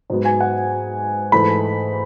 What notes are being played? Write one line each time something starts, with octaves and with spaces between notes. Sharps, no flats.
G#2 F#3 B3
G#5
F#5
G#2 E3 A3 B5